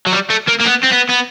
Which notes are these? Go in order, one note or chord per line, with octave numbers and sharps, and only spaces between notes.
F#3
G3
A3
A#3
A#3
B3
C4
B3
B3